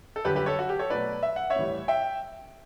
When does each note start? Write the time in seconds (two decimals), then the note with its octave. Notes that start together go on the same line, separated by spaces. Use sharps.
0.16 A4
0.25 F#2 D3 G3 G4 B4
0.36 G4 B4
0.46 A4 C#5
0.59 F#4
0.69 G4
0.79 A4 C#5
0.90 B2 F#3 A3 B4 D5
1.23 E5
1.36 F#5
1.50 C#5 E5
1.56 A2 E3 G3
1.88 E5 G5